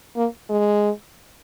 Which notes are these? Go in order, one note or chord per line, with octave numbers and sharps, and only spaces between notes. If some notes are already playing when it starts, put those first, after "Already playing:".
A#3
G#3